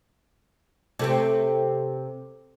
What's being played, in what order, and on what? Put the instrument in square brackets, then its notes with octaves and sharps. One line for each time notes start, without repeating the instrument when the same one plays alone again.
[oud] C3 A3 C4